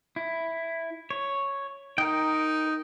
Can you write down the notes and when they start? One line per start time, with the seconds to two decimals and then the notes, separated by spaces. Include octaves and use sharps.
0.16 E4
1.11 C#5
1.98 D#4 A#4 G5